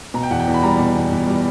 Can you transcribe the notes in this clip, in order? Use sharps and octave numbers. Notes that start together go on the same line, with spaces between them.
B2 A#5
G5
E2 F#5
G5
E2
B5
G3 A#5
B2
E2
E2
G3